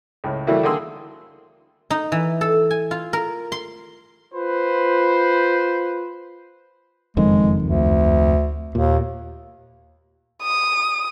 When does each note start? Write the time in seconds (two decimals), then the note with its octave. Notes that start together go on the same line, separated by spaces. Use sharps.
0.24 C#2 A2
0.47 E3 G3 A3 A#3 E4 F#4
0.63 D3 D#3 A#3 G#4 C6 E6
1.90 D#4
2.12 E3
2.41 A4
2.71 G#5
2.91 F4
3.13 A#4
3.52 C6
4.34 F4 B4 C5
7.17 F#1 F2 D#3 G#3
7.63 D2
8.75 D#2 A#2
10.43 D#6